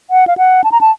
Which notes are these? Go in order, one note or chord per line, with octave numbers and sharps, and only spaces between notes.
F#5
F5
F#5
A5
A#5
A5